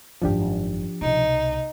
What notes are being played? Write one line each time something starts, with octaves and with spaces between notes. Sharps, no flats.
G#1 F#2 F3 D4 G4
C2 B2 D#4